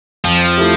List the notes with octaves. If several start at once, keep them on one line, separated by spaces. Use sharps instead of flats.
F2 F3
A3 E4 G4